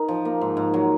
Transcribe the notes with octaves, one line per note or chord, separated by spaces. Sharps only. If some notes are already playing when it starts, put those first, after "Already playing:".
Already playing: D#4 A#4
F3
A#3
G#2
G#2
F#3